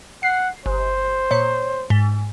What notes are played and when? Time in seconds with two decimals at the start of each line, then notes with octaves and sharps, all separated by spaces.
0.23 F#5 C7
0.66 G1 C5
1.31 A#2 C#5
1.90 G#2